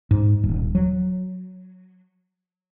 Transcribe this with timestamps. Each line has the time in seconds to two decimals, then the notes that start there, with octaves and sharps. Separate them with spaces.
0.11 G#2
0.43 D#1
0.75 F#3